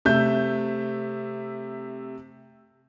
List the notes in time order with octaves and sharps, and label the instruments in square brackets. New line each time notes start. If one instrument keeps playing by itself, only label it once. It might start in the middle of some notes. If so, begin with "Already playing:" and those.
[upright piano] C3 A3 E5 G6